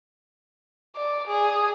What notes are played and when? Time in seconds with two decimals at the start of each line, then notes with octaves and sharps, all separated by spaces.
0.96 D5
1.27 G#4